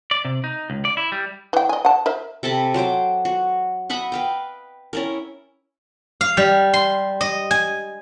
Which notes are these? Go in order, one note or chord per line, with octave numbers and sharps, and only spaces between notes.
D5
C3
D#4
C#2
D5
E4
G3
E3 G5
D#5 G#5
F#5 A5
A#4 C5 E5
C3 A4 A5 B5
F#3 C5 G5 D6
F#4
D#5 E5 F#5 B5
B4 F5 G5
C#4 E4 A#4
F5
G3
C6
D#5
G#5